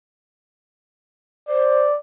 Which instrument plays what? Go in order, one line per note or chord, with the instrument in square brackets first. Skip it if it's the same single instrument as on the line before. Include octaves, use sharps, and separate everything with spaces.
[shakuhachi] C5 [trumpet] D5